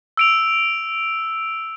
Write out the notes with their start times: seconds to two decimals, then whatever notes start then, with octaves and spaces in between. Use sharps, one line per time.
0.17 E6 D7 F7